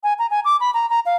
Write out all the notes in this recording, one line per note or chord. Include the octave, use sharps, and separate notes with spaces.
G#5
A#5
G#5
D6
B5
A#5
A#5
F5